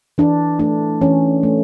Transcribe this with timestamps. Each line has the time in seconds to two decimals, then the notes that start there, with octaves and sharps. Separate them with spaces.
0.18 E3 D4
0.59 A3 D4
1.01 E3 C#4
1.43 A3